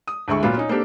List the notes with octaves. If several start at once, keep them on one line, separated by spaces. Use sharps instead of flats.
D#6
D2 G#3 E4 C#6
A#2 F#3 B3 F4
C#4 D#4
A#3 C4 D4 G4 A4